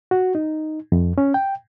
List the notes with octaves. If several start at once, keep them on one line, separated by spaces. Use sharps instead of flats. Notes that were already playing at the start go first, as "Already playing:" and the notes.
F#4
D#4
F2
C#4
G5